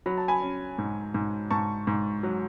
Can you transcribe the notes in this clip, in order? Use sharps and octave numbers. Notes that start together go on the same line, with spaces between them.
F#3 B5
A5
G#5 B5
C#4
G#2
G#2
G#2 A5 C#6
G#2
F#3